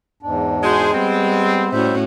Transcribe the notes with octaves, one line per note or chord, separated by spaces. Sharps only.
E2 G#2 D4
G#3 F#4 G#4 C5
G3 B3 C4
A2 G3 C#4 F#4 C5 E5